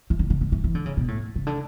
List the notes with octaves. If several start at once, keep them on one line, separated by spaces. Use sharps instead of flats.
E3
D3
D3
D3
E3
E3
D3
C#3
B2
A2
C#3
D3